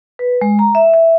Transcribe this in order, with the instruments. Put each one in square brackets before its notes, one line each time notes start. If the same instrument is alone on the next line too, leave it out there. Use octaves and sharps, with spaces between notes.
[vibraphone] B4
G#3
A#5
E5
E5